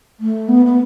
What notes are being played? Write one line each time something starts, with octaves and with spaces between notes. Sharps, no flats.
A3
B3
B3